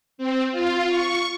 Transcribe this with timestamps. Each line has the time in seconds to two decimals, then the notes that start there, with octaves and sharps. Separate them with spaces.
0.18 C4
0.52 F4
0.88 C#6